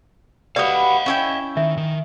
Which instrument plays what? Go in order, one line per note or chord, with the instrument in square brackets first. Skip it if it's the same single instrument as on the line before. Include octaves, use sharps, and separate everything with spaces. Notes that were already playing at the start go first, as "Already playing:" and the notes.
[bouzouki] F#4 G4 B4 [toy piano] D5 D#6 [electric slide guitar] D#5 F5
[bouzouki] C#4 E4 G5
[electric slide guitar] D#3 [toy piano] E5
[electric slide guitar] D#3